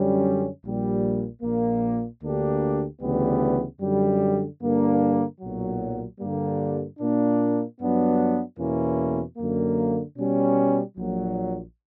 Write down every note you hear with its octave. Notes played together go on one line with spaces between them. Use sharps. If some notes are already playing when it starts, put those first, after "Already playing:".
Already playing: F#2 D3 G3 C#4
A#1 A#2 G3
A#1 A#2 A#3
D2 D3 A#3 D4 G4
D2 C#3 E3 G3 B3
F#2 D3 G3
G2 D3 A#3 D4
B1 A#2 F#3
G2 D3 G3 A#3
A#2 A#3 D4
G2 F#3 B3 D4
E2 B2 A#3 C#4 E4
F#2 D3 A#3
B2 G3 C#4
A#1 A#2 F#3